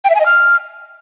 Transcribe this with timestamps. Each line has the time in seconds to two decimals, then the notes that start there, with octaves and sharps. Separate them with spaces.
0.04 G5
0.10 E5
0.15 G#5
0.20 D#5
0.26 F6